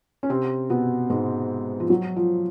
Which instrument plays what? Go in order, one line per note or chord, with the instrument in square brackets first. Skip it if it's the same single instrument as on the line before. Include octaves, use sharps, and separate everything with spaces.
[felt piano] C#4
C3 C4
B2 B3
G#2 G#3
F3
F#3
F3